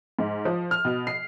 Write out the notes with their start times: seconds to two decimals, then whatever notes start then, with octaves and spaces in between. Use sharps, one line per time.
0.19 G#2
0.45 F3
0.71 F6
0.85 B2
1.07 C7